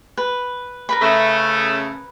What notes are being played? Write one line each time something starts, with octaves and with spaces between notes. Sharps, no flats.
B4
A#4 B4 B5
C#3 A3